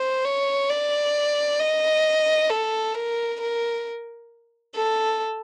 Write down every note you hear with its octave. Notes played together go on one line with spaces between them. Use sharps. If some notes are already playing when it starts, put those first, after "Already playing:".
Already playing: C5
C#5
D5
D#5
A4
A#4
A#4
A4